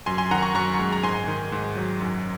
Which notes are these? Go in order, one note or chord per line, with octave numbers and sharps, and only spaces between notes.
F#2 G#5 C6
G#5 C6
D#3 F#5 A#5
A#5 C#6
F#2 A#5 C#6
G#3
A#5
G#2 G#5 C6
D#3
G#2
F#3
F#2